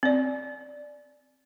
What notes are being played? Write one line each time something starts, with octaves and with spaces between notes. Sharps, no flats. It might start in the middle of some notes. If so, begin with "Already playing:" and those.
C4 D5